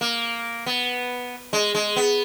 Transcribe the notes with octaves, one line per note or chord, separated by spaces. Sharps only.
A#3
B3
G#3
G#3
B3